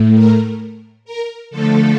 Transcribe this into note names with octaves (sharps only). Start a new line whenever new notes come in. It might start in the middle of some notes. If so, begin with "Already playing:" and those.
Already playing: A2 A3
A#4
A#4
D3 F3 A3 A4